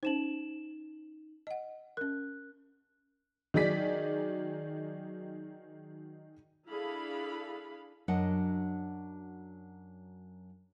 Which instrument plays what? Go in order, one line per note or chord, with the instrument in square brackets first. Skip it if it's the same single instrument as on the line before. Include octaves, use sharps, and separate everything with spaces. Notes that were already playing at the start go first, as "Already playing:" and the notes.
[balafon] C#4 C5 [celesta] D#4 E7 F#7
[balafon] D#5 F#5
[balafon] C#4 A#4 [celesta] F#6
[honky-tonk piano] D#3 F#3 D#4 G#4 D5 B6
[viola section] D4 E4 G#4 A4 F5 B5
[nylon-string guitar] F#2 F#3 D4 D#5 F#5